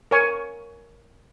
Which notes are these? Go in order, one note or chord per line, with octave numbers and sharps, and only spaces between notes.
A#4 C#5 G#5 C#6